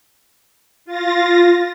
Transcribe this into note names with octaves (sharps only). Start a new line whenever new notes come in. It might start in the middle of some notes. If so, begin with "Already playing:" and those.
F4 A6 A#6